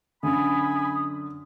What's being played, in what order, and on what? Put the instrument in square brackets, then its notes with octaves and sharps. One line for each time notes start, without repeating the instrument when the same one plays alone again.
[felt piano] F#2 D3 [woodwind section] G#5 B5 [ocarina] D#6